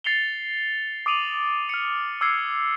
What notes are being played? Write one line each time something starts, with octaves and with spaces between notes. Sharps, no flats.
A6 C7 C#7 F7 G7
D6 D#6 D7 D#7 F7 F#7
F6 C#7
D6 E6 F6 G#6 C7 C#7